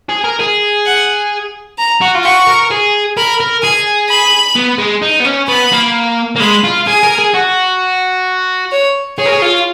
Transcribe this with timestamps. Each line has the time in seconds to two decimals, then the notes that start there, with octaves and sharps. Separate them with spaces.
0.09 G#4
0.25 A#4
0.40 G#4
0.86 F#5
1.78 A#5
2.02 F#4
2.15 F4
2.24 F#4 C#6
2.47 A#4
2.71 G#4
3.17 A#4 B5
3.40 A#4
3.63 G#4 G#5
4.09 B5
4.56 B3
4.78 G#3
5.02 D#4
5.20 B3
5.25 C#4
5.48 B3 B5
5.72 A#3
6.36 A#3
6.40 G#3 B5
6.64 F4
6.87 G#4 G#5
7.03 A#4
7.18 G#4
7.34 F#4
8.72 C#5
9.18 G#4 C#5
9.26 A#4
9.33 G#4
9.42 F4